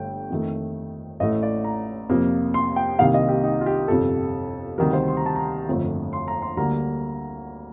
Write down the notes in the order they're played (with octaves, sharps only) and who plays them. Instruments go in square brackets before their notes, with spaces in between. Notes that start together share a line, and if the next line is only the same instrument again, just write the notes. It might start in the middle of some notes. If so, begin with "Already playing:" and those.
Already playing: [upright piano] G1 G2 D3 A3 G5
F2 D#3 A3
A1 A2 A3 D#5
D5
A#5
F2 C3 F3 A#3
C6
G5
C2 C3 D#3 G3 A#3 F5
D#5
G4
D#4
F4
G4
G1 F2 C3 A4
D2 C3 D#3 G3 A#4
C5
C6
A#5
A5
A#5
G1 F2 D3 F3 A3
C6
A#5
C6
D2 D3 G3 A#3 A#5